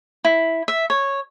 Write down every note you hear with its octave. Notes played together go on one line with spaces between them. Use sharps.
E4
E5
C#5